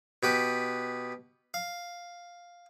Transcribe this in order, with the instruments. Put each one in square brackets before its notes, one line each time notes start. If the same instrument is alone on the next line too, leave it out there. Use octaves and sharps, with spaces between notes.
[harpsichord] B2 G4 B4
F5